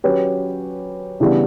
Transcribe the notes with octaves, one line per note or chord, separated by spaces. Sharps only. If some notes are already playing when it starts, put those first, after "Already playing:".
F#3 C#4 G4 B4
C#3 E3 G3 B3 D4